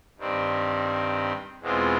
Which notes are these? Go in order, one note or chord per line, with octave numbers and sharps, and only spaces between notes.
G2 D#3 G3 C4
E2 B2 G#3 C4 F4